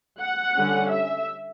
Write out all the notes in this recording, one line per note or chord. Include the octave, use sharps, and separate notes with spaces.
F#5
D3 G3 C#4
E5